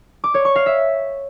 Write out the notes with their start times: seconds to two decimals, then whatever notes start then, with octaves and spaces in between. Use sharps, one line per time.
0.24 D6
0.34 C#5
0.45 C#6
0.56 F5
0.66 E5